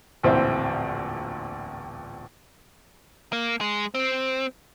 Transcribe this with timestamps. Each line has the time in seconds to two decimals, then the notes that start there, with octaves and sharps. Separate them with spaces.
0.23 D1 A#1 E2 C4 E4 C5
3.33 A#3
3.61 G#3
3.94 C4